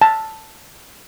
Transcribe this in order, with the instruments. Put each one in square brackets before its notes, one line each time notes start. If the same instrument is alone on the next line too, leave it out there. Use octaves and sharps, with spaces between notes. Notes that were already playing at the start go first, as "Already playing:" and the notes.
[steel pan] A5